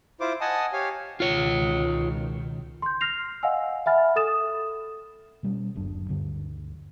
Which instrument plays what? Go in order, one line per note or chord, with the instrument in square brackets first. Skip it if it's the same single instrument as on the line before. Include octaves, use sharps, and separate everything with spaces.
[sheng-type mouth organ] E4 F4 C5 D6
D#5 F#5 G#5 A5 D#6
G4 C#5 F5 G#5
[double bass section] C#2 B2 D#3 [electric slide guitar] F4 C#5
[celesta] C6 G6
F6 A#6 C7 F7
D#5 F5 F#5 G#5 E6
E5 F#5 G#5 B5 F6 A6
A4 D#6 A6 E7
[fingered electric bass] B2 G3 C4 C#4
D1 G1 F#2 D4
D2 G2 D3 D4